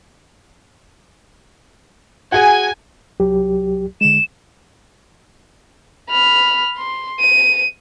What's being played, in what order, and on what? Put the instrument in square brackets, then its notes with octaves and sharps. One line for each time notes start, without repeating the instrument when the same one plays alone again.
[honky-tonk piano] F#4 G#4 [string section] G#5
[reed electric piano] C2 F#3 G4
[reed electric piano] D3 G#3 [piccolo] E7
[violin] B5 F6
C6
D#7